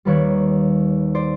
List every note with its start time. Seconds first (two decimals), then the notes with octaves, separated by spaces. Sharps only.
0.05 D#2 D#3 G3 B4 C#5
1.15 C5 D5